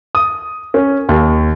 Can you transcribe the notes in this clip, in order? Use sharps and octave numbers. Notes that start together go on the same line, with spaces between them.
D#6
C#4
D#2